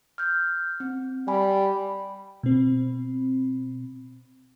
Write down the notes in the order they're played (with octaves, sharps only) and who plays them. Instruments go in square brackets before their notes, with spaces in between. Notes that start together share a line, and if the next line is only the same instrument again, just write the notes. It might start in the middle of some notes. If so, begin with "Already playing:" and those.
[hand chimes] F6 G6
C4
[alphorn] G3 [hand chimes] G#5 B5
[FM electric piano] B2 C4